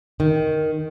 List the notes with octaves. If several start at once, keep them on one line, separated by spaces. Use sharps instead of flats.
D#3